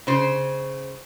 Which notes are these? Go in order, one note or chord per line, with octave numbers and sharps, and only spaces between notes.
C#3 C5